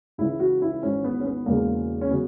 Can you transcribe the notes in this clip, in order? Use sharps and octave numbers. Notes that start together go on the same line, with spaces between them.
C#2 C#3 E3 E4
F#4
E4
G#1 G#2 E3 C#4
B3
C#4
B3
E1 E2 C#3 G#3 A#3
C#4
C#3 F#3 B3